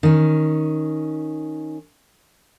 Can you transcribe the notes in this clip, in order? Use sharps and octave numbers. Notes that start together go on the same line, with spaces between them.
D#3 C#4